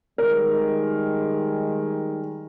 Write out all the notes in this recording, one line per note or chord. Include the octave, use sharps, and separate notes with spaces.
D#3 G3 G#3 A#4